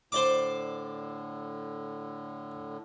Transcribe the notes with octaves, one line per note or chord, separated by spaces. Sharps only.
A2 D3 C5 D5 D6